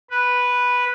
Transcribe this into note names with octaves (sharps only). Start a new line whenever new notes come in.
B4